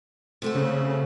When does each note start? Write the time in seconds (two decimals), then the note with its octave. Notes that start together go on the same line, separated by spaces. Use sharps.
0.42 C3 A3 F#4
0.55 C#3